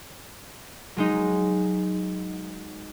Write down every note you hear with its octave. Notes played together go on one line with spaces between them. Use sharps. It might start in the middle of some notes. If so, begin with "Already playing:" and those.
F#3 G#3 D#4